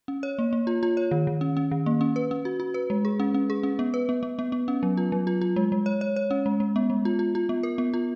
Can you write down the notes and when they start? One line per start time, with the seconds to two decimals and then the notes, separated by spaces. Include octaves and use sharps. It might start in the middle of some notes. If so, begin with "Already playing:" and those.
0.08 C#4
0.23 C#5
0.39 A#3
0.53 A#3
0.67 F4
0.83 F4
0.97 C#5
1.11 D#3
1.27 D#3
1.41 C#4
1.57 C#4
1.71 D#3
1.86 A#3
2.01 C#4
2.16 B4
2.31 C#4
2.45 F#4
2.60 F#4
2.74 B4
2.90 G#3
3.05 G#4
3.20 C#4
3.34 C#4
3.50 G#4
3.63 C#4
3.79 B3
3.94 B4
4.09 B3
4.23 B3
4.39 B3
4.52 B3
4.68 C#4
4.83 F#3
4.97 F4
5.12 F#3
5.27 F4
5.41 F4
5.56 G#3
5.72 G#3
5.86 C#5
6.01 C#5
6.16 C#5
6.31 C#4
6.46 G#3
6.60 G#3
6.76 B3
6.90 G#3
7.05 F4
7.19 F4
7.35 F4
7.49 B3
7.63 A#4
7.78 B3
7.94 F4